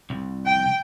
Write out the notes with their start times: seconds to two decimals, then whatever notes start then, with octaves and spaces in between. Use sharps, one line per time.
0.10 C2
0.46 G5